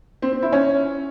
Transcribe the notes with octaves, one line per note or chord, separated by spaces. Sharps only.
C4
C4
E4
C#4